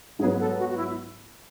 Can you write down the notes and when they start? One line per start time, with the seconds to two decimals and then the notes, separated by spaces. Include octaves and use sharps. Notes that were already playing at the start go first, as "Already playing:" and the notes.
0.19 G#2 F#3 B3 G#4
0.40 A4
0.59 F#4
0.70 F#4
0.77 E4